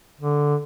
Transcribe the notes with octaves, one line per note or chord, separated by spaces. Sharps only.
D3